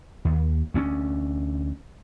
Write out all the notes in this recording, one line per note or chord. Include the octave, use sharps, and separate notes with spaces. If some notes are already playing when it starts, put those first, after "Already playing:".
D#2
D2 C4 C#4